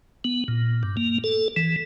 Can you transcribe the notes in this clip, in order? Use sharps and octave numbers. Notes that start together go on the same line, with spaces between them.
B3
A#2
G2
A#3
A4
E3